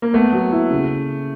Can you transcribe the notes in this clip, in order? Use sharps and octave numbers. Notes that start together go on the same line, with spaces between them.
A#3
A3 B3
F#3
E4
C#3